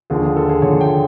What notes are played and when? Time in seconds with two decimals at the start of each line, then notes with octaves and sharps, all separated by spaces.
0.10 D#2 D3 F3 G#4
0.23 G#4
0.36 A4
0.49 G#4
0.62 D#2 D3 F3 C#5
0.81 G5